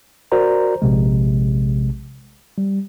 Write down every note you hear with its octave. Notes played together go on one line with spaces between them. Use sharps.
F#4 A#4 C5 D5 A#5
A#1 C3 G#3
G3